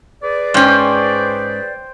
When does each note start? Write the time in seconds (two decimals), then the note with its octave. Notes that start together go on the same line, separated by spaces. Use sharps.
0.22 G#4 B4 D5
0.54 G#2 C#4 C5 G5